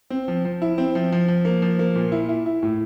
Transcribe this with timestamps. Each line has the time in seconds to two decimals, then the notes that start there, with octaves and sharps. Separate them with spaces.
0.10 C4
0.28 F3
0.45 F3
0.62 E4
0.78 C4
0.95 F3
1.12 F3
1.28 F3
1.45 A#3
1.62 F3
1.79 A#3
1.96 A#2
2.12 E4
2.29 E4
2.46 E4
2.63 A2